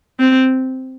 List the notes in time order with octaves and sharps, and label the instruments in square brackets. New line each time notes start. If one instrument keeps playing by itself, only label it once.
[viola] C4